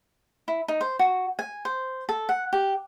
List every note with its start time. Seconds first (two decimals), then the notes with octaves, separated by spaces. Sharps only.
0.48 E4
0.68 D#4
0.81 C5
0.99 F#4
1.39 G#5
1.65 C5
2.09 A4
2.29 F#5
2.53 G4